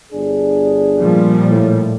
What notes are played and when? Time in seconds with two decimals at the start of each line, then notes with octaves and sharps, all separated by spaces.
0.12 G1 D4 G#4
0.99 A#2 F3 G3
1.48 A2